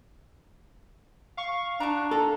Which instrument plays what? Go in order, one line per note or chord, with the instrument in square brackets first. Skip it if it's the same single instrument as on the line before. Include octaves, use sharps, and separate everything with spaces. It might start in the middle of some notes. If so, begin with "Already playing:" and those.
[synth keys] F5 C#6
[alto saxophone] D4 [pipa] F#4 A#5
[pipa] F4 A#5 [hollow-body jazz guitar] A4